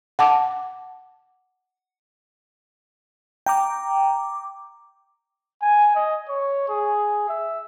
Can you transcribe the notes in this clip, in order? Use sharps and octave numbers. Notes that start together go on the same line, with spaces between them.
F#5 A5 D6
G5 A#5 D6
G#5
D#5
C#5
G#4
E5